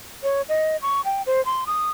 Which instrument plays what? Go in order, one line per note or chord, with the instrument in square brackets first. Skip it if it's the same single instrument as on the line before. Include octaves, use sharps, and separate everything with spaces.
[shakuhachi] C#5
D#5
C#6
G5
C5
C6
D#6